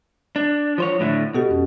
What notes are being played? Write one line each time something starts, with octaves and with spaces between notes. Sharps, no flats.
D4
F3 C5 C#5
A2 D3 A3
B2 F#4 G4 A4
F2 C#4